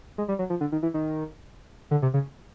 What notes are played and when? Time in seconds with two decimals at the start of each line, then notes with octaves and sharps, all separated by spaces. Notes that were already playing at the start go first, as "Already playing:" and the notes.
0.18 G#3
0.28 G3
0.39 F#3
0.50 F3
0.61 D3
0.72 D#3
0.83 E3
0.94 D#3
1.91 D3
2.02 C3
2.14 C#3